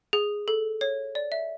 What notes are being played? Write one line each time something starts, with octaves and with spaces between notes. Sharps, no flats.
G#4
A4
C#5
D5
E5